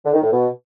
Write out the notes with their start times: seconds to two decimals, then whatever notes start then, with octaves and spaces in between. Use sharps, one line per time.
0.04 D3
0.13 D#3
0.22 A2
0.31 B2